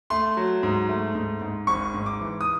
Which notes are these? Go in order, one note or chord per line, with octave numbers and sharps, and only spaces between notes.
A3 C6
F#3
G#2
A3
G#2
G#2
G#1 C#6
G#2
D6
E3
D#6